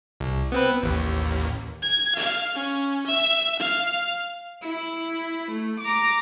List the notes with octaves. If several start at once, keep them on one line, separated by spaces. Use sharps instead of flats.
C2
B3 C4 B4
A1 D#2
G#6
F5
C#4
E5
F5
E4
A3
A#5 D6